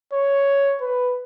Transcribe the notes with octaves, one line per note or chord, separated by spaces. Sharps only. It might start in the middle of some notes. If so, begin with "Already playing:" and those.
C#5
B4